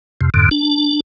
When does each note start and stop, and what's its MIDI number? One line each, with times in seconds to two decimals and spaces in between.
0.21 0.30 41
0.21 0.30 48
0.34 0.49 41
0.34 0.49 44
0.34 0.49 50
0.51 1.00 62